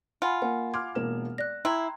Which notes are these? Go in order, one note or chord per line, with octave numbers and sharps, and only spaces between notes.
F4 F#5 G#5 B5
A#3 F#5 G#5
C6 D6 F6 G#6
E1 A#3 E7
D5 F#6 A#6
E4 G5 A#5 C6 G#6